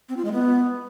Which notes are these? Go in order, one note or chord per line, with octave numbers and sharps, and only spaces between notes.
C4
F4
G#3
B3